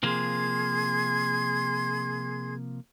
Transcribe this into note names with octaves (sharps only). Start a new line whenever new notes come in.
C3 F3 A#3 G#4 C6 G#6